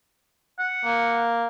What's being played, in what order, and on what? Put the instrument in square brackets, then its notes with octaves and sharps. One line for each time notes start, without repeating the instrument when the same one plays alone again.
[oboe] F#5
[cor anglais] A#3